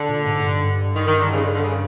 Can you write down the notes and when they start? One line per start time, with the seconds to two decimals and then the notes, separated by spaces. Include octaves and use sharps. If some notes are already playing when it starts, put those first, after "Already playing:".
Already playing: D3
0.09 A#2
0.26 G#2
0.43 G2
0.95 D#3
1.07 D#3
1.20 D3
1.32 C#3
1.45 D3
1.55 D3
1.63 C#3